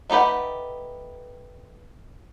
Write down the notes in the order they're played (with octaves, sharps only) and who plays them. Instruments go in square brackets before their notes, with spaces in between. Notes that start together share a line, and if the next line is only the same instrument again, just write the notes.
[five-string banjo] A3 D#4 G4 B4 F#5